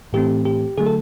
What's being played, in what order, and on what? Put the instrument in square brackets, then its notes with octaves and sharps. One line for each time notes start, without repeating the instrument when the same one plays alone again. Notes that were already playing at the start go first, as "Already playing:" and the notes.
[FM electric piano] A2 E3 A3 C4 G4
G4
D3 F#3 A3 G#4
A4